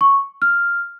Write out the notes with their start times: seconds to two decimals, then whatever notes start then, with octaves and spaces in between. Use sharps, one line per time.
0.01 C#6
0.42 F6